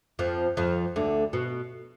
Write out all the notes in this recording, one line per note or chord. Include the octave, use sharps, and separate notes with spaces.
F2 F3
F2 F3
D2 D3
B2